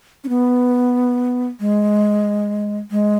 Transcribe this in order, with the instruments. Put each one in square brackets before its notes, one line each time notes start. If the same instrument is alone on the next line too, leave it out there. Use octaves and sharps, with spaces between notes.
[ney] C#4
B3
G#3
G#3